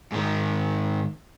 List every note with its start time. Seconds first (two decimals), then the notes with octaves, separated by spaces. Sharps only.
0.12 G#2 D#3